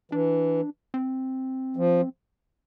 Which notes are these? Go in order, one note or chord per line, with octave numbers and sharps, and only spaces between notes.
E3 D4
C4
F3